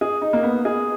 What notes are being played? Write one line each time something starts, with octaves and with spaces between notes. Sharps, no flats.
G#4
D#4
A#3
B3
G#4